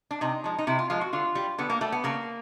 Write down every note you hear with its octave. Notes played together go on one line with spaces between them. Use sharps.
D4
C3 D#4
F3 G#3
D#4
C3 E4
F4
F3 G#3 F4
F#4
D3 F4
G3
D3 B3
A#3
G3 A3
B3
C#3 A#3